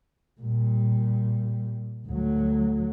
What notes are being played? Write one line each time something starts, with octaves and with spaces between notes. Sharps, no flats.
A#2 G3
D2 F#3